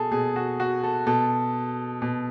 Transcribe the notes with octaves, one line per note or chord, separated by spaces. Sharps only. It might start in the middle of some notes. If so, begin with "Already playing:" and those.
Already playing: B2 G#4 A4
B2 G#4
F#4
F#4
A4
B2 A4
B2